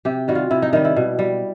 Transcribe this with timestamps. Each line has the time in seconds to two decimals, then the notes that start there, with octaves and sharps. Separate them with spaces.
0.05 C3 G4
0.28 D#3 G3 F#4
0.35 F4
0.51 C3 E4
0.62 D#4
0.73 D#3 G3 D#4
0.85 E4
0.97 B2
1.19 G3